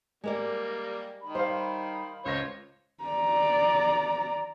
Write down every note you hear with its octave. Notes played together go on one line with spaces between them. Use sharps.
G3 G#3 A#3 A#4 D5
D#3 B5
G3 C5 F5
C#2 F4 C5 C#5 A#6
D5 A#5